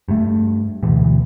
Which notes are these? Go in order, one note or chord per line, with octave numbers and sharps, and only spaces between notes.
G2 A3
D2 B2 E3